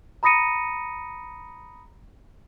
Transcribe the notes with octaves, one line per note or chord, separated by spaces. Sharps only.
A#5 B5 D#6 A#6 C#7 D#7